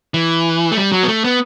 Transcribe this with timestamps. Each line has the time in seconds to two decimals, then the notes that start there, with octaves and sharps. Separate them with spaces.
0.14 E3
0.72 A3
0.77 G3
0.92 F#3
1.03 B3
1.08 A3
1.24 B3